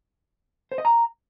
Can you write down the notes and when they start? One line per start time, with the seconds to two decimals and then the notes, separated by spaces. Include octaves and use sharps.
0.72 C5
0.78 D#5
0.85 A#5